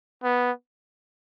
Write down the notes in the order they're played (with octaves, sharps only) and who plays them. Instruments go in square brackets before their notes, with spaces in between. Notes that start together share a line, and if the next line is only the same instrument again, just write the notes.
[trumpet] B3